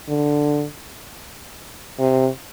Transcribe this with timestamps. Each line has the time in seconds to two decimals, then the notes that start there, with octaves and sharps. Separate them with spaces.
0.08 D3
1.99 C3